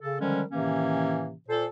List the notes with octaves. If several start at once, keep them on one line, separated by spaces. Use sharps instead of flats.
C#3 A4
D3 D#3 F3 G3 G#3 C#4
A2 C3 D#3 E3 A#3 C#4
A#2 A4 C5